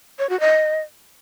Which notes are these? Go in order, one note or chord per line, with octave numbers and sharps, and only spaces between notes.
C#5
F#4
D#5